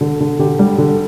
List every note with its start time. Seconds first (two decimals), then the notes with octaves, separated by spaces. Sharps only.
0.01 D3
0.20 D3
0.39 D3 G4
0.59 G3
0.78 D3